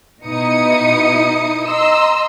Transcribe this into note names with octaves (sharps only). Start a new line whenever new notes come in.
B2 D#4 E4 D#6 C#7
D#5 A#5 C6 E6